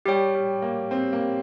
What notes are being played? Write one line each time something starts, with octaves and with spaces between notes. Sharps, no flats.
G3 G4 C#5 G5
G3
A#3
C4
A#3